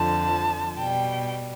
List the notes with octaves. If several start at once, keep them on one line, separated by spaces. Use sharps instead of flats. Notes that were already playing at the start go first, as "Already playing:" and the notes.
Already playing: F2 D3 F3 A5
B2 G3 G5